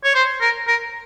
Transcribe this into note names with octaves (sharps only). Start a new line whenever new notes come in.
C#5
C5
A#4
A#4